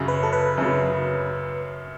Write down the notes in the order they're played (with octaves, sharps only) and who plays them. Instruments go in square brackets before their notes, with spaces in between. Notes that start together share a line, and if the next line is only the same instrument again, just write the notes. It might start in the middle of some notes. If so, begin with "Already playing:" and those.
Already playing: [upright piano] F#2 C#3 F#3
[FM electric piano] B4
A4
B4
[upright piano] F#2 C#3 F#3